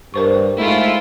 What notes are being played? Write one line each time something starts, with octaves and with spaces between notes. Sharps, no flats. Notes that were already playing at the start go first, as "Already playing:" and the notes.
G2 A#4 C5 C#6
G#2 A3 E4 F4